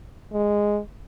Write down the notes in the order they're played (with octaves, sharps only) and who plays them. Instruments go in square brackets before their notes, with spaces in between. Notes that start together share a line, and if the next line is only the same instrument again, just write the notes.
[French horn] G#3